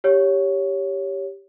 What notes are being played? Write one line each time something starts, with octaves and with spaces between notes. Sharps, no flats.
G4 C#5